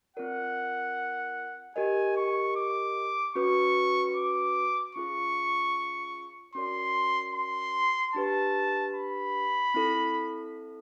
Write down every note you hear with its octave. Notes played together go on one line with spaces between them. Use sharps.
C4 F4 A#4 D5 F#5
G4 A#4 D#5 G#5
C#6
D6
C#4 F#4 B4 C#6
D6
C#4 F4 G#4 C#6
C#4 F#4 A#4 D5 C6
C6
D4 G4 B4 A5
B5
C4 E4 A4